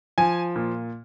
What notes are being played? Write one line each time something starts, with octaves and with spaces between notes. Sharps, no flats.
F3 G#5
A#2